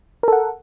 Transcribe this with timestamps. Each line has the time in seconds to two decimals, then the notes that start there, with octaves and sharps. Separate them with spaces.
0.23 A#4
0.28 A4
0.32 F#5